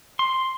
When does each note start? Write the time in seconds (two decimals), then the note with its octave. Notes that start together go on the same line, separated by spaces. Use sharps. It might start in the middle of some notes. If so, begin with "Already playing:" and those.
0.19 C6